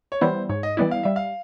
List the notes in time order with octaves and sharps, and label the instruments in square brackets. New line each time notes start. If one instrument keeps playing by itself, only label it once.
[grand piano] C#5
[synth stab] E3 G3 B3 E4 [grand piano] C5
[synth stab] G#2 [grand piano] C#5
[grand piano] D#5
[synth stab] E3 G3 B3 E4 [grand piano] D5
[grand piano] F5
[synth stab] G3 [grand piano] E5
[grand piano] F5